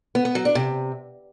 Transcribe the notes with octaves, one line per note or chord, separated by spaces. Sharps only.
B3
B3
F#3
D4
C3